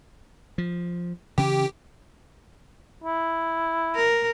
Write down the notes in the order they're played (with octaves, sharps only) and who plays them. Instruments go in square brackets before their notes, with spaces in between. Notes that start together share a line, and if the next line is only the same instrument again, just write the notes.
[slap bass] F3
[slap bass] C#3 E3 C#4 [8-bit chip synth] G4
[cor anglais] E4
[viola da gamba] A#4